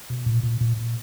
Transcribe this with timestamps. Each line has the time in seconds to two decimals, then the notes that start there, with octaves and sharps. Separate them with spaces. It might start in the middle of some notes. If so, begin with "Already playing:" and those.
0.10 B2
0.26 A#2
0.43 A#2
0.61 A#2
0.77 A#2